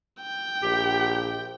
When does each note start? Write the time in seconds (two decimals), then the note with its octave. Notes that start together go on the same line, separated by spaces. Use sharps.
0.23 G5
0.63 A#1 G4